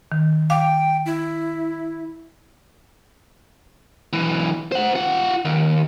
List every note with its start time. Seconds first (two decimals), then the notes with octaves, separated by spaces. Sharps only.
0.12 D#3
0.50 F5 G5 D6
1.06 E4
4.13 B1 E3
4.72 C5 F#5
4.95 F4 F#5
5.45 D#2